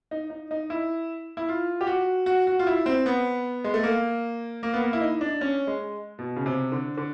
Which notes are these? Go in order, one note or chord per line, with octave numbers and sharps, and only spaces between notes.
D#4
D#4
D#4
E4
E4
F4
G4
F#4
F#4
F#4
F4
E4
C4
B3
G#3
A3
A#3
A#3
B3
A#3
E4
D#4
D4
C#4
G#3
B2
C#3
C3
D3
D3